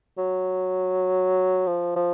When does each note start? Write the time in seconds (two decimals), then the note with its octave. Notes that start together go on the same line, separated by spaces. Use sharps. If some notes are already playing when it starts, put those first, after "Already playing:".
0.18 F#3
1.67 F3
1.96 F3